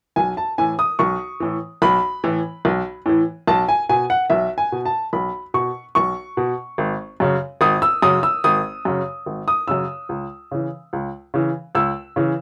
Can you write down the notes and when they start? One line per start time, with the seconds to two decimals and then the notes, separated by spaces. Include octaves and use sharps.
0.16 B1 G#5
0.37 A5
0.58 A2 E3 G#5
0.79 D#6
0.99 B1 C#6
1.40 A2 E3
1.82 B1 B5
2.24 A2 E3
2.65 B1
3.06 A2 E3
3.48 B1 A5
3.69 G#5
3.89 B2 G#5
4.10 F#5
4.30 B1 E5
4.58 G#5
4.72 B2
4.85 A5
5.13 B1 B5
5.54 B2 C#6
5.95 B1 C#6
6.37 B2
6.78 G#1
7.20 F#2 C#3
7.61 G#1 D#6
7.82 E6
8.02 F#2 C#3 D#6
8.23 E6
8.44 G#1 D#6
8.85 F#2 C#3
9.26 G#1
9.48 D#6
9.68 F#2 C#3 E6
10.09 C#2
10.52 C#3 E3
10.93 C#2
11.34 C#3 E3
11.75 C#2 E6
12.16 C#3 E3